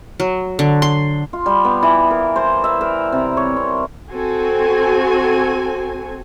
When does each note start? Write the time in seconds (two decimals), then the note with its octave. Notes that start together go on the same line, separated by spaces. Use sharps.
0.20 F#3
0.59 D3
0.82 C6
1.33 F4
1.46 G3
1.65 B3
1.83 E3
2.11 A#4
2.36 C5
2.64 E5
2.81 A#4
3.12 C3
3.37 C#5
3.56 C4
4.12 C4 F#4 A4 G#5